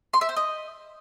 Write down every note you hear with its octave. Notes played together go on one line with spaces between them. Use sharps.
C6
E5
C5
D#5